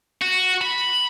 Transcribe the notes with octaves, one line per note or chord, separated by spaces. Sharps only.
F#4
B5